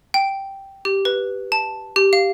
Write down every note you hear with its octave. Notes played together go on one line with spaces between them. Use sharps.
G5
G4
B4
A5
G4
F5